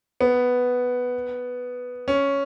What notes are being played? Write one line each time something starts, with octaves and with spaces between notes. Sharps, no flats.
B3
C#4